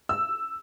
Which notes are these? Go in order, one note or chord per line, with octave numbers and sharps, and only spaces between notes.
E6